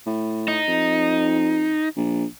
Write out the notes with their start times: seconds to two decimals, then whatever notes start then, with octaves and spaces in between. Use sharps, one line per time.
0.06 A2
0.48 D#4
0.68 F2
1.96 A#1